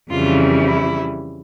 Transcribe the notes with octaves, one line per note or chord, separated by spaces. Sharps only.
F2 C#3 E3 G3 F4
E4